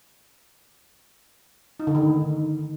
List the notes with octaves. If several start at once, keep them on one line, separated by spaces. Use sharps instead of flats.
D#4
D3
D#3